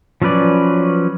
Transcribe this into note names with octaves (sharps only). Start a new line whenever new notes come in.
F3 F#3 C#4 B4 D5